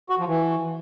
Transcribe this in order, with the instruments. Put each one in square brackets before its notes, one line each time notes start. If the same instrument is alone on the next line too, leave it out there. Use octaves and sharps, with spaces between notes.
[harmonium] F#4
F3
E3